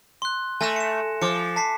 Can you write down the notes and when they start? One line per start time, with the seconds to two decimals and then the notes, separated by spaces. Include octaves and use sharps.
0.22 C6 F#6
0.61 A3 G#5 A#6 E7
0.76 C#7 E7
1.21 F3 D6 C#7
1.56 A5 B6 C7